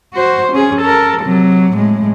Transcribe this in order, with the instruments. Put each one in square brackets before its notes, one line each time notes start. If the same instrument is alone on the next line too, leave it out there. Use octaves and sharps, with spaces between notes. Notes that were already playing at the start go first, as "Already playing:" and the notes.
[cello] F#4 C5
C#4 G#4
A4 A#4
C3 F#3
A2 G#3